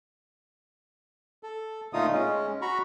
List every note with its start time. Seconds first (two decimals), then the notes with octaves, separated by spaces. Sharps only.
1.43 A4
1.93 A#2 D3 A3 D#4 F4 D#6
2.12 G#3 C#4
2.62 F#4 A#5 B5 C#6